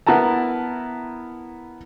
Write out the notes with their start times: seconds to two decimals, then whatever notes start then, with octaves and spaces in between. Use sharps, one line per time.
0.07 B3 E4 A#4 A5 A#5